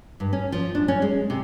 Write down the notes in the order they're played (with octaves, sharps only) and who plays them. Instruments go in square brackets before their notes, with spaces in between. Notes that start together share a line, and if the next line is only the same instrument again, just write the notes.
[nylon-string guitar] G2
C#4
F3
D4
C#4
G#3
C3